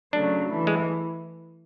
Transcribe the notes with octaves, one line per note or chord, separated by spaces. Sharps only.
C#3 F#3 A3 D4
E3 A3 E4
G#3